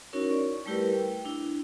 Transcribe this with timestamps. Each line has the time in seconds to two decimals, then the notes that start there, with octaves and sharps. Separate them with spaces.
0.13 C#4 D#4 E4 F#4 A#4 C#5
0.29 D5 C#6
0.66 G3 A3 E4 G4 A#4 B4
0.94 G5
1.25 D4 E4